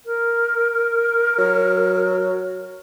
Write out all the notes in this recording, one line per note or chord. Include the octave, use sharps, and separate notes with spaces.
A#4
F#3